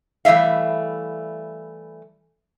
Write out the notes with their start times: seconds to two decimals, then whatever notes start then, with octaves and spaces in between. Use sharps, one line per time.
0.25 E3 G3 A3 E5 F5